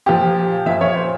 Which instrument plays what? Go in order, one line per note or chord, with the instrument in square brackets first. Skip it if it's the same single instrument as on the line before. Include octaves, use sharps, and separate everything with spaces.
[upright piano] A#2 F3 G4
A#2 F3 E5
C#5
C5